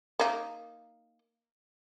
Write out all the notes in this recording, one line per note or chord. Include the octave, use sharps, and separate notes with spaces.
A#3 D#4